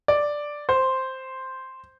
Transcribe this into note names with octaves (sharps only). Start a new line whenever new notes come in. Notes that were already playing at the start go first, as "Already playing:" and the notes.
D5
C5